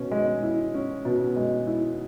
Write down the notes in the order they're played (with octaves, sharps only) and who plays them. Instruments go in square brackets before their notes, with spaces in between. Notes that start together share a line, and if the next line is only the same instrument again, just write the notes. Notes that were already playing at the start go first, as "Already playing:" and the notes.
Already playing: [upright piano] B2 C#4
G#3
E4
C#4
B2
G#3
E4